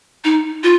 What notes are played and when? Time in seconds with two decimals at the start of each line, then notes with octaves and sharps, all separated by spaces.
0.24 D#4
0.63 F4